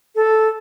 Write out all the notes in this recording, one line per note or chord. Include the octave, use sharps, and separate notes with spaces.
A4